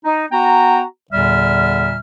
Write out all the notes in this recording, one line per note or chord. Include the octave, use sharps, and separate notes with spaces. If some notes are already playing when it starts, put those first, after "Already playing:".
D#4
B3 F#4 G5 A#5
E2 A#2 D3 G3 E5 F6